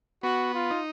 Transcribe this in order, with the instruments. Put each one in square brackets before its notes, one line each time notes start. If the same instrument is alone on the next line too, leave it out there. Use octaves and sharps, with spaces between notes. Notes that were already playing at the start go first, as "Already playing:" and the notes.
[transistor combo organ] B3 [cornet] F#4
[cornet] F4
[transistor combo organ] D#4